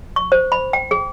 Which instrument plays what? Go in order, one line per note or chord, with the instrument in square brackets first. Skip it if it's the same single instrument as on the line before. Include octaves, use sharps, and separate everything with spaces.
[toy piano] C#6
C5
B5
G5
G#4